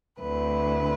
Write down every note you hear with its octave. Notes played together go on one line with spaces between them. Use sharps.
D2 D3 A3 C4 E4 B4